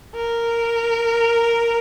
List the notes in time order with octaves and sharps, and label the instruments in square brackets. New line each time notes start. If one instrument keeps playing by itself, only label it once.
[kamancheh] A#4